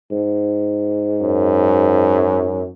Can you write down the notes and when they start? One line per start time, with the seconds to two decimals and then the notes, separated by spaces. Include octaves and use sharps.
0.11 G#2
1.21 F#2